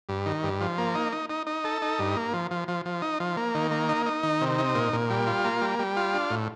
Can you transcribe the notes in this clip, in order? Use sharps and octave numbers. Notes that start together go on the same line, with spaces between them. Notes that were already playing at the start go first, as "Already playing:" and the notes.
G2
D#3
G2
F3
A#3
D#4
D#4
D#4
D#4
A4
D#4
G2
A#3
F3
F3
F3
F3
D#4
F3
A#3
D#3
A#3
D#4
D#4
D#3
C3
D#4
A#2
A#2
G3
F4
A#3
G3
G3
F4
D4
A2